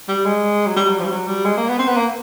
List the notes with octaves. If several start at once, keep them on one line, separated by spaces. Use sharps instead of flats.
G3
G#3
F#3
G3
F#3
F3
G3
F#3
G3
G#3
A#3
B3
C4
B3
A#3